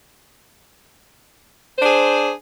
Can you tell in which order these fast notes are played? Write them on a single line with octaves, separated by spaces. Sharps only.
C5 D4 G#4